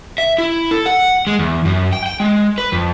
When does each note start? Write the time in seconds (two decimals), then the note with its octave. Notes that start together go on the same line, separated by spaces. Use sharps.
0.18 E5
0.38 E4
0.71 A4
0.86 F#5
1.27 G#3
1.39 E2
1.65 F#2
1.93 G5
2.06 G5
2.20 G#3
2.58 B4
2.72 F2